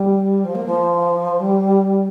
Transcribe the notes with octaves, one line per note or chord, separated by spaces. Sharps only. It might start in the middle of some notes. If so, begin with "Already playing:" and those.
Already playing: G3
F3
A#3
F3
G3